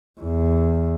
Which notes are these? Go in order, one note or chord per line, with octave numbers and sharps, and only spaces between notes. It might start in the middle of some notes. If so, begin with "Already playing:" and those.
E2